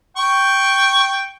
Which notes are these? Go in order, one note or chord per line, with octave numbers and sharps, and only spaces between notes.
G5 C#6